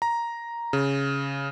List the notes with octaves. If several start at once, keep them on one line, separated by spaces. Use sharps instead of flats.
A#5
C#3